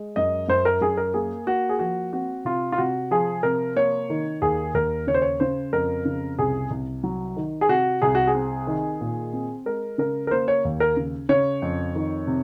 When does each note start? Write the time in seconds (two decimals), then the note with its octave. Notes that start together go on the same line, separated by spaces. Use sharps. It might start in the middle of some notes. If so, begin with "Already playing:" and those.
Already playing: G#3
0.16 F#2 D#5
0.48 F#2 C5
0.65 A#4
0.81 F#2 G#4
0.97 A#4
1.14 A#3 G#4
1.47 A#3 F#4
1.69 G#4
1.79 F3 F#4
2.13 C4 F#4
2.45 C3 F4
2.72 F4
2.78 C3 F#4
3.11 F3 G#4
3.43 C3 A#4
3.76 A#3 C#5
4.10 D#3
4.42 D#2 G#4
4.74 D#2 A#4
5.07 C#3 C#5
5.14 C5
5.22 C#5
5.40 C#3 C5
5.73 F2 A#4
6.05 C#3
6.39 C2 G#4
6.71 C2
7.04 F#3
7.37 D#3
7.61 G#4
7.69 C3 F#4
8.02 C2 G#4
8.15 F#4
8.27 G#4
8.35 C4
8.67 D#3
9.01 A#2
9.33 C4
9.66 G#3 A#4
9.98 C#3 A#4
10.27 A#4
10.31 A#3 C5
10.48 C#5
10.65 D#2
10.80 A#4
10.97 C#3
11.29 C#3 C#5
11.62 F2
11.95 D#3
12.27 C3